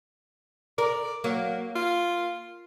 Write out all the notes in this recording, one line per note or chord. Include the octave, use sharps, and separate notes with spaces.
A#4 D5
F#3 A#3
F4